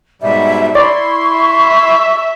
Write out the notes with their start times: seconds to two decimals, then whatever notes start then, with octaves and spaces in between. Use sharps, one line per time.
0.22 G#2 B2 G3 E5
0.75 E4 D5 C6 C#6
1.38 E5